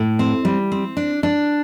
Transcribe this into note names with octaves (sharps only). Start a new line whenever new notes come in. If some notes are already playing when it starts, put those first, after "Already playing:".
Already playing: A2
C4
G3
C4
D4
D4